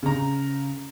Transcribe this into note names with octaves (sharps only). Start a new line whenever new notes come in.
C#3 A#5